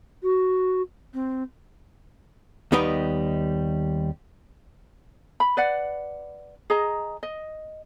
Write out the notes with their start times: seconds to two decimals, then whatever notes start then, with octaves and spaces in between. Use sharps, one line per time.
0.23 F#4
1.14 C4
2.72 D#2 G3 B3 D#4 B4 G5
5.40 B5
5.57 B4 D5 F#5
6.70 G#4 D#5 A#5
7.23 D#5